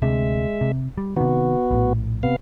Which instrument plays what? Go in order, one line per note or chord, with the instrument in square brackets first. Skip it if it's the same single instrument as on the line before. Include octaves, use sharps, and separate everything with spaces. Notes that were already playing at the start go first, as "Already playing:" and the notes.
[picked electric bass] D2 C3 C4 [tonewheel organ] G#3 E5
[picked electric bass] C3
G3
[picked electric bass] C3 D#3 [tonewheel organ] B3 F#4
[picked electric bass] A#1 A2
[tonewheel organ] C3 B3 F5